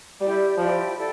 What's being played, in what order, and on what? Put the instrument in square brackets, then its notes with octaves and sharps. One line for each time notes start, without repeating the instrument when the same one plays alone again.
[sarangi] G3 [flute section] E4 G4 D5 G5
[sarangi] F3 [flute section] E4 G4 D5 G5
[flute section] E4 A4 D5 G5